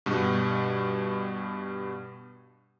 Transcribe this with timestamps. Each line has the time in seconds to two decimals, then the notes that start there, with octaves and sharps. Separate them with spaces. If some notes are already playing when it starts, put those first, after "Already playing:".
0.06 G2 B2 G3